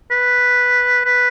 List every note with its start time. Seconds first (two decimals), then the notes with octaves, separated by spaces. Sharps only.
0.11 B4
1.05 B4